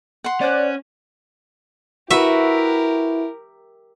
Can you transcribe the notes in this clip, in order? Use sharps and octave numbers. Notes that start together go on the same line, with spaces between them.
F#5 C6
C#4 C5 D5 F#6
E4 F#4 G4 A#4 B4 E5